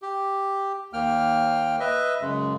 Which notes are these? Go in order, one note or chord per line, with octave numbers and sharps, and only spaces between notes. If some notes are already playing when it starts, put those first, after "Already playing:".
G4
D#2 A#3 G5 F6
B4 D#5 E5
F#2 C#3 G#3